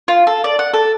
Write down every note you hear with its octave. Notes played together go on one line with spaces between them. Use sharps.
F4
A4
D5
F#5
A4